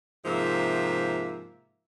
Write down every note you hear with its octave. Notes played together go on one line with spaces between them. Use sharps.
G#2 C3 F3 A#3 E5